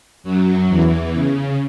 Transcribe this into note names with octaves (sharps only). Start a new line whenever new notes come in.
F#2 F#3
E2 E3
C#3